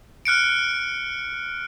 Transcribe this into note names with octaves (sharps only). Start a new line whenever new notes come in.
F6 F#6 C#7 D7